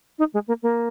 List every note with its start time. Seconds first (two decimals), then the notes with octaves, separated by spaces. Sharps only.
0.19 D#4
0.34 G#3
0.48 A#3
0.63 A#3